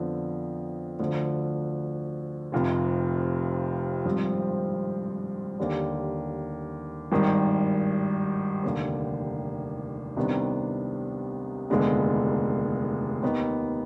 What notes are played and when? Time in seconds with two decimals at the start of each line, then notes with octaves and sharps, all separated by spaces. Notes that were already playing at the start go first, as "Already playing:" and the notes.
Already playing: F2 D3 F3 B3
0.99 D2 D3 F3
2.52 F1 F2 C3
4.05 G#1 G2 F3 C4
5.59 D#2 D3 G3
7.12 G#1 G2 D#3 G3
8.63 F1 D#2 D3
10.16 C2 C3 D#3 B3 D4
11.70 F1 D#2 D3 G#3 B3
13.23 D#2 D#3 B3 D#4